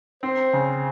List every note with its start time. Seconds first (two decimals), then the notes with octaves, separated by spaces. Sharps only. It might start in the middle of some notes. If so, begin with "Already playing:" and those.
0.23 C4 C5
0.53 C#3